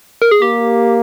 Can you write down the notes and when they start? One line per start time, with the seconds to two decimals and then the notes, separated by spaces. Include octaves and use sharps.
0.22 A#4
0.31 G#4
0.42 A#3 G4